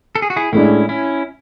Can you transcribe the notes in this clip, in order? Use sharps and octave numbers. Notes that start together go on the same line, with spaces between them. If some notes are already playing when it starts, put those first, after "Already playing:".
A4
G#4
F#4
E4 G#4
A2 G#3 C#4 D4 E4
C#4 E4